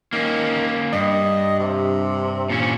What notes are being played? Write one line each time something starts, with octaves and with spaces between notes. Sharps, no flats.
D#3 A#3 C#4
G2 D#5
C3
A#2 C#4